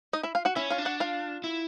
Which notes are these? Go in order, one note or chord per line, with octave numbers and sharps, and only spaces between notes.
D#4 D#5
E4 E5
F4 F5
F#4 F#5
C#4 E4 E5
F4 F5
D4
F#4 F#5
F4 F5
E4